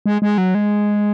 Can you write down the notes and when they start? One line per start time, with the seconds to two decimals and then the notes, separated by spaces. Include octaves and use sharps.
0.06 G#3
0.22 G#3
0.38 F#3
0.55 G#3